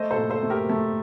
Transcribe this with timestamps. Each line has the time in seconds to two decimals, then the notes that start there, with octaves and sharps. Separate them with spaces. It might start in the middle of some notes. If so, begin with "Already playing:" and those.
Already playing: A3 C5 D#5
0.11 A4 C5
0.17 A#2
0.30 A4 C5
0.43 A3
0.50 G4 A#4
0.69 A3